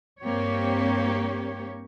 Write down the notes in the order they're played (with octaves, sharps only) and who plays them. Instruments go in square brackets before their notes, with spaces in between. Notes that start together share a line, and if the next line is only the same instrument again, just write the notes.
[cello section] G2 A#3 C4 G4 C#5